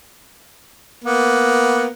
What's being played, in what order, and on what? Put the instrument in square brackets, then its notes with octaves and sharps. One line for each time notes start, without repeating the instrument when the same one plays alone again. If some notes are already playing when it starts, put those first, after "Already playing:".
[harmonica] A#3 B3